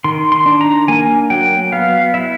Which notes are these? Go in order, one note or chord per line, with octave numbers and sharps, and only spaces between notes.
D#3 C6
C6
D4
A#5
A#3 G#5
F#3 G5
B3 F5
E4 E5